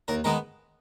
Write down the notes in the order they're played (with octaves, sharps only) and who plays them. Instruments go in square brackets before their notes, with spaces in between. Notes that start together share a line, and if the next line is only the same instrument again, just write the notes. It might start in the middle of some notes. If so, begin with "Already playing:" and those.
[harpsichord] D#2 A#4
D#3 G#3 B3 A#4